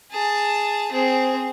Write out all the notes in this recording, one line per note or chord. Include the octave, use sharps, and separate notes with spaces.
G#4 A5
C4 G#4